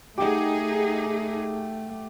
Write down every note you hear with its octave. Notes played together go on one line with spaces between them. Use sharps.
A3 D#4 G4 G#4 F#5